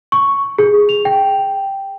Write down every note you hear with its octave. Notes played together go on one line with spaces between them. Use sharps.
C#6
G#4
F7
G5